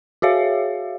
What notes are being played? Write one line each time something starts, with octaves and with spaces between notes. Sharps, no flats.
F#4 G#4 C#5 E5 F5